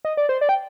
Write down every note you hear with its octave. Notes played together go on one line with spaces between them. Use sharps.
D#5
D5
C5
D5
G5